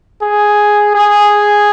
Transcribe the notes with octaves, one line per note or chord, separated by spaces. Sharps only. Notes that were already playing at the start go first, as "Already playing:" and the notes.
G#4
G#4